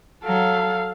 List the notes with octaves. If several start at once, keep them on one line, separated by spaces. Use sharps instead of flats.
F#3 A4 F5